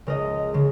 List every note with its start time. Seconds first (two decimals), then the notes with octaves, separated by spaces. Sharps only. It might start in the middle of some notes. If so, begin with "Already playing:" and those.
0.07 C#2 C#3 G#3 A#4 D#5
0.54 C#3 G#3